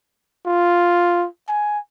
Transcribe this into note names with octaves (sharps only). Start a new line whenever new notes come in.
F4
G#5